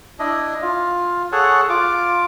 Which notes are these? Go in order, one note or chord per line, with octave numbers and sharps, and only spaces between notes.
D4 E4 D#5
F4
G#4 A4 C#5 F#5
F4 D6